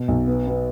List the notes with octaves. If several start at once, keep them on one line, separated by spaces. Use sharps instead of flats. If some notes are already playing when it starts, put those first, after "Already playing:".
Already playing: B2
B1
B3
B3